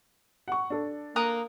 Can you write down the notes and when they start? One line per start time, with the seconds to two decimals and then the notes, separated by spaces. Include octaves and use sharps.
0.48 F#5 C#6
0.70 D4 A4
1.16 A#3 A#5 D#6 F#6